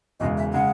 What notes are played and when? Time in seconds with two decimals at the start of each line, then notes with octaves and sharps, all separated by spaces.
0.20 E1 E2 C#3 G#3 D#5
0.37 E5
0.53 C#3 G#3 F#5